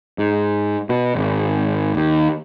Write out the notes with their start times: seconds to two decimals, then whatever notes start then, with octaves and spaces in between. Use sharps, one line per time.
0.18 G#2
0.89 B2
1.15 G#1
1.95 D#2